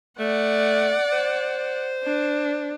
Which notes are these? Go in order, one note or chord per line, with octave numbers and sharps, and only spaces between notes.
A3 D5 F#5
C5
D4